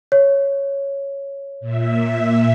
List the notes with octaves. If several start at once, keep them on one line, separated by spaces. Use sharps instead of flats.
C#5
A#2 E5